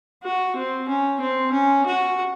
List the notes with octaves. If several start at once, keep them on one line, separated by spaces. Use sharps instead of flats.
F#4
C4
C#4
C4
C#4
F#4